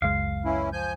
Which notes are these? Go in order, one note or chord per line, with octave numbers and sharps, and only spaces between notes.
F#1 C#2 G#3 F5
E3 C#4 E4
F3 G#5 G6